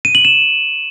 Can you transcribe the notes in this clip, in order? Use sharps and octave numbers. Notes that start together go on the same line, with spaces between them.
D#7
F#7
E7